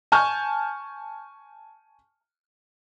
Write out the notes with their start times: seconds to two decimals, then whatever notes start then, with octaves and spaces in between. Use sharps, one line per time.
0.12 G#5 A5 C#6 F6 G6